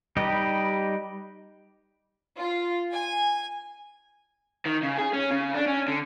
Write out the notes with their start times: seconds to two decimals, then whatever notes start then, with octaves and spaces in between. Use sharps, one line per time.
0.17 G3 D#4 G4 B4 D#5
2.38 F4
2.91 G#5
4.66 D#3
4.83 C#3
4.98 G#4
5.13 C#4
5.31 C#3
5.54 D4
5.67 C#4
5.88 D3